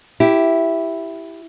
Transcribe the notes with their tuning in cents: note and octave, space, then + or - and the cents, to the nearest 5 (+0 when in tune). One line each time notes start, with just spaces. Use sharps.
E4 +0 G4 -5